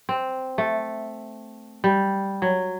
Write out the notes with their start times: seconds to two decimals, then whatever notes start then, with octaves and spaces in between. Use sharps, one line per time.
0.09 C4
0.58 A3
1.84 G3
2.42 F#3